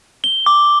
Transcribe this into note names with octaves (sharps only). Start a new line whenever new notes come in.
G7
D6